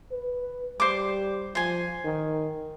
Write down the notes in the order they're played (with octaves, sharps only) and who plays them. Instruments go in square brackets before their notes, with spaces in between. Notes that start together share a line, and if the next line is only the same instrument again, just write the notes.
[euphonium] B4
[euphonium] G3 [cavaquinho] C5 D6
[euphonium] F3 [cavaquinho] C5 G#5
[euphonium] D#3